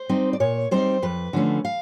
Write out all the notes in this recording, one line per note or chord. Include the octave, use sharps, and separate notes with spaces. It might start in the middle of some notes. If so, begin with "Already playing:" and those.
Already playing: C5
G3 C4 D#4
D5
A#2 C#5
G3 C4 D#4 C5
F2 B4
D3 F3 A3 C#4
F5